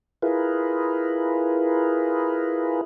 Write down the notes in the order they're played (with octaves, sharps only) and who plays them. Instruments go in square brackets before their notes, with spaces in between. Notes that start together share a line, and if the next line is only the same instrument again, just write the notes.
[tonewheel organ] E4 F4 G#4 A#4 B4